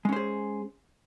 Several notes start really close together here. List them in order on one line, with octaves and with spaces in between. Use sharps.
G#3 C#4 C5 G#4